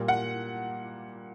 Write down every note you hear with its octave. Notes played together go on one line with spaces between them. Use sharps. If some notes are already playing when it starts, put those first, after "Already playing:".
Already playing: A#2 G3 A#3
F#5